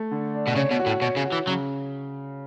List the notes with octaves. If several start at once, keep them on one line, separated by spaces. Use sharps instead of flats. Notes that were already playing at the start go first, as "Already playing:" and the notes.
Already playing: A3
D3
D4
B2
C#3 C#5
B2
F#4
A2
B2 C#5
C#3
F#4
E3
C#3 F#3